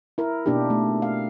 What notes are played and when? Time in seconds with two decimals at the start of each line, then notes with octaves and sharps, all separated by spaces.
0.18 E4 A#4
0.46 B2 A#3 D4 D#4 G4
0.70 A3
1.02 F5